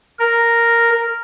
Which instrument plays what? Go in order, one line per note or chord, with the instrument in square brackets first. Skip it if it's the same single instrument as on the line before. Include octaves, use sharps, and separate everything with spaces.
[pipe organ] A#4